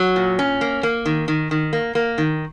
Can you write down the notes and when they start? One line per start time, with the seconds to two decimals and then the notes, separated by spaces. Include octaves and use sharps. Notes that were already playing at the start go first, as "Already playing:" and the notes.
Already playing: F#3
0.16 A#2
0.39 C#4
0.61 A#3
0.83 A#3
1.06 D#3
1.28 D#3
1.51 D#3
1.73 A#3
1.95 A#3
2.18 D#3